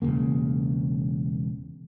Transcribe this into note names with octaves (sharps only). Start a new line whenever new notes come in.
E1 E2 C#3 A#3